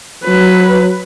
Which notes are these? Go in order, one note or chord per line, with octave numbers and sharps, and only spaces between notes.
F#3 B4